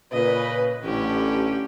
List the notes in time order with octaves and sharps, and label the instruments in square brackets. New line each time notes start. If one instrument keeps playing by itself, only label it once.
[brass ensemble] A#2 C#3 B4 [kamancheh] D#5
[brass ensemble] A1 D3 [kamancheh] C#4 G4